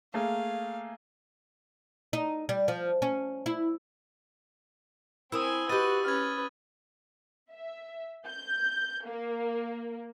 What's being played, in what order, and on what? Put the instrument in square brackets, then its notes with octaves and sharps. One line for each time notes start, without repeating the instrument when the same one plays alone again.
[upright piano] A3 A#3 G#4 [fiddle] F5
[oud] D#4
G3
F3
C#4
E4
[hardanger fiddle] C4 G#5 [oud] E4 A#4 [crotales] D#6 E6
[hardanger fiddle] F#4 B4 [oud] G4 D#5 [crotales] D#6 A6 D#7
[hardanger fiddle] C#4 B4 [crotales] F6 G#6
[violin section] E5
G6
A#3